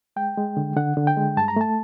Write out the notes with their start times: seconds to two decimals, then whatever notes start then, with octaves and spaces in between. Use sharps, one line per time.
0.16 G#3 G5
0.37 G#3
0.57 D3
0.76 D3 F#5
0.97 D3
1.07 G5
1.17 G#3
1.37 G2 A5
1.48 A#5
1.56 A3 A5